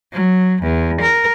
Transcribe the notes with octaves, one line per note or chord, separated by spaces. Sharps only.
F#3
E2
A#4